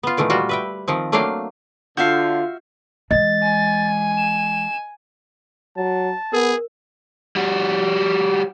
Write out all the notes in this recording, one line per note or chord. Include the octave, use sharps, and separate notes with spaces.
B3 F4
A#2 D#3 E3 A3
G3 F4 F#4
B4 E5 G5
D#3 F3 C4
F#3 A3 A#3 D4 F5 G5
D3 F4 F#4 E5 F5 G6 C7
E3 G#3 D#5 A6
G#5
E7
F#3 A5
B3 G#4 A#4
G3 F#4